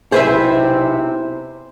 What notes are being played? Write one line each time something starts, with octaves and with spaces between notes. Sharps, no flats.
B1 C3 E4 G#4 B4 C5 E5